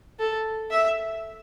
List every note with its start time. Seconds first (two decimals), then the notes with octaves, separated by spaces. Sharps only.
0.20 A4
0.71 E5